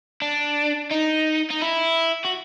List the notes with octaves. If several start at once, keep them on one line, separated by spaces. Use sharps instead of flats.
D4
D#4
D#4
E4
F#4